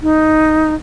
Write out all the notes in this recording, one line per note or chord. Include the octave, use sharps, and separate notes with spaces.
D#4